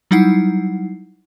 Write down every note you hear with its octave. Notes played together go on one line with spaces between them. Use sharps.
F#3 G3 D#4 E4 F#5 C7